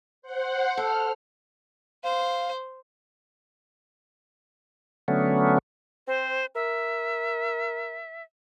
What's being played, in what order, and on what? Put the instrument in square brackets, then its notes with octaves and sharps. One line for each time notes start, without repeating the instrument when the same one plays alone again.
[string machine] C5 F#5
[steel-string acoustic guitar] A4 [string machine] F6
[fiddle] C5 [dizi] F5
[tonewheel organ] D3 F#3 A3 B3 C#4
[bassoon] C4 [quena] C5
[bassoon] A#4 [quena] E5